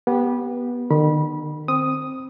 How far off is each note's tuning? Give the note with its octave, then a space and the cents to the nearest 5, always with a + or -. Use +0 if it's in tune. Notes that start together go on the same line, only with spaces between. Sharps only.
B3 -20 G4 +0
D#3 -40 B5 -25
C4 +0 D#6 +0